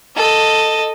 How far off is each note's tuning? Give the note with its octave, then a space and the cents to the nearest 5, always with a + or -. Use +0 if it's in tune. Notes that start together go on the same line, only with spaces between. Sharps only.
A4 +5 D#5 +0